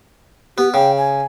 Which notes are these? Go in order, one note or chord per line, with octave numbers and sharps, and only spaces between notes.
B3 G4
C#3 G5
G#5